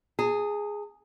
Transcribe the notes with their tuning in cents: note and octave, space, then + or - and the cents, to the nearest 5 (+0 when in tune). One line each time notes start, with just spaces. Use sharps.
G#4 +0 A5 +45